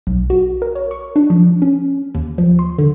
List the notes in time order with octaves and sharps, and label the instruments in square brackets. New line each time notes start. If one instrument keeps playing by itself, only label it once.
[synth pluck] B1
F#4
A#4
C#5
C#6
D4
F3
C#4
D#2
F3
C6
D3